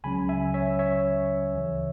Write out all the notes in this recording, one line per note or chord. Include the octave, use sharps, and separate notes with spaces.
C#2 C#3 F#3 C#4 G#5 B5
E5 G#5
C#5 E5
C#5 E5
D2 C#3 E3